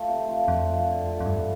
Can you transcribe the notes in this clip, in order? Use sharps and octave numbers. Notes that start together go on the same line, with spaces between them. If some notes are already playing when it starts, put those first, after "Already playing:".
Already playing: A3 F4
C3
A3 F4
F2 D3
A3 F4
D3
A3 F4
F2
G2 G3